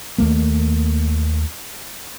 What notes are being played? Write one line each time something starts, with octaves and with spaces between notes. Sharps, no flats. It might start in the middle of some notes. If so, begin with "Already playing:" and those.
D#2 A3 A#3